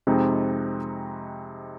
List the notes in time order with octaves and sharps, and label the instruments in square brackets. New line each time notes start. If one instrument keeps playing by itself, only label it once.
[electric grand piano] F2 C3 G#3 C4 D#4